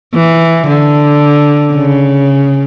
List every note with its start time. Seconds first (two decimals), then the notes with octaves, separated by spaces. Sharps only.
0.14 E3
0.67 D3
1.74 C#3